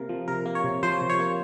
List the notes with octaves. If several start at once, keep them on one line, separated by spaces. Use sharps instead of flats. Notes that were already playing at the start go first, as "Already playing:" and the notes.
Already playing: C3 A#3 A#4
F3
C3 A#4
A#3
C#5
C3
F3 C5
C3
C#5
A#3